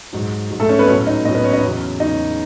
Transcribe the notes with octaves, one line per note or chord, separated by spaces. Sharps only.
G#2 F#3
G#2 F#3
A3 A4
C#4 C#5
B3 B4
A2 F#3 C#4 C#5
D#4 D#5
A2 F#3 D#4 D#5
B3 B4
C#4 C#5
D#4 D#5
E2 C#3 F#3
E2 C#3 F#3 D#4 D#5